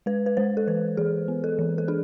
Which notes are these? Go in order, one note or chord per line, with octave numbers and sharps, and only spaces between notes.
G#3 B4
B4
G#3 C5
A4
E3 B4
E3 G#4
B3
A4
E3
A4
D4 G#4